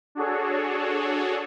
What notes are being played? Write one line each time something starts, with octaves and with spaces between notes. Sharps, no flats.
D4 F#4 G#4 A4 C#5